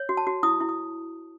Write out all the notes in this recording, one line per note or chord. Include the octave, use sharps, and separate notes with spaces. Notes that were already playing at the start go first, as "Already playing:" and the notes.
Already playing: C#5
F#4
A5
F#4
E4 D#6
E4
D#6